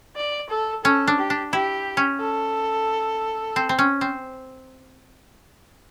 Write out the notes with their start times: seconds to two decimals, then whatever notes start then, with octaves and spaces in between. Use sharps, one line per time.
0.16 D5
0.50 A4
0.84 C#4 A4
1.08 D4
1.18 G4
1.30 D4
1.52 E4 G4
1.97 C#4
2.20 A4
3.56 C4
3.69 C4
3.79 C#4
4.01 C4